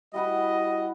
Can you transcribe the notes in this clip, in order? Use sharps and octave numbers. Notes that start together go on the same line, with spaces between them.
G3 E4 F#4 D#5 F#5 B5